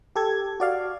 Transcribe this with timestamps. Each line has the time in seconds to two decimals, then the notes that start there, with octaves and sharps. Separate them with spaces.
0.16 G4 A4 G#6
0.60 F#4 D5 F5